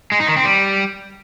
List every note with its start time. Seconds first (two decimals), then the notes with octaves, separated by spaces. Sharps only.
0.12 G#3
0.20 D#4
0.28 D#3
0.36 C4
0.45 G3